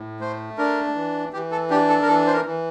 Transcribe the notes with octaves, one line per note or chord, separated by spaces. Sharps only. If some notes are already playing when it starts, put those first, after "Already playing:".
Already playing: A2
A3 C5
D4 A#4
E3
E3 G4
A4
D4 G4
A4
A#4
E3 A4
C5
A#4
E3